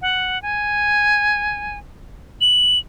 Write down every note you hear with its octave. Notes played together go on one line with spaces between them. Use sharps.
F#5
G#5
F#7